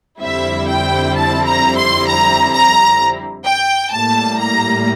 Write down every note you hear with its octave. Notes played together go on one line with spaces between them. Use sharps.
F2 D3 G3 C4 E4 E5
G5
A5
A#5
C6
A#5
A#5
G5
A2 G3 A#3 A5
A#5